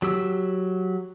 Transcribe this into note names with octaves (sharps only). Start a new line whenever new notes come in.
F#3 G4 E6